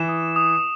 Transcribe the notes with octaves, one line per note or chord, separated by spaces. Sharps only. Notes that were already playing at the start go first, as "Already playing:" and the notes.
Already playing: E3 E7
D#6
D#6